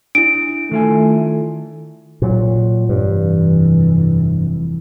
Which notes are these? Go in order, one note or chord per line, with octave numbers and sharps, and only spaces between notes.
D4 E4 D7
D#3 A3 F4 G#5
A#2 F#3
F1 G2 E3